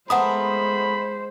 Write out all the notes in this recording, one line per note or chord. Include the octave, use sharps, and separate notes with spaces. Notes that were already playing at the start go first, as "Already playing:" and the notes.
G#3 A3 B3 A#4 C5 F#5 B5 D#6